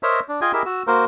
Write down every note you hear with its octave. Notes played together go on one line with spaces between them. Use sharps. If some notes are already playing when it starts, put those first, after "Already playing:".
A#4 C5 C#5 D#5 E5 A#5
D4
F4 G#4 D#5 G5 G#5
E4 G4 G#4 A#4 D#5 E5
F#4 E6
A#3 F#4 A#4 C5